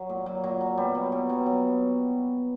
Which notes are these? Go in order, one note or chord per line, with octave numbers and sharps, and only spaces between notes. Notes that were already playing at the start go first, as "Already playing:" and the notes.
Already playing: F#3
A#2
F#3
A#2 F#3
F#3
B2 G3
F#3
B2
F#3
F#3